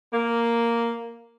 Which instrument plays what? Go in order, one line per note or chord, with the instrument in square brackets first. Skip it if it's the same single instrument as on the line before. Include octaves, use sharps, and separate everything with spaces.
[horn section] A#3